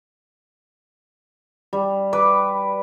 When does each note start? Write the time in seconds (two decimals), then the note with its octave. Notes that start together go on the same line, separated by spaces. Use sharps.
1.73 G3
2.13 B4 D6